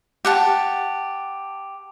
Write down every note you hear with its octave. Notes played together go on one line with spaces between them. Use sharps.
G4 F#5 A5